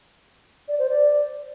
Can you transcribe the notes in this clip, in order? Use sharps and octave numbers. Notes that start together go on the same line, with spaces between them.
D5
C5
D5